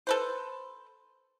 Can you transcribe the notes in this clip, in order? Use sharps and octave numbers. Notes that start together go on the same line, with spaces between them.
A4 B4 C5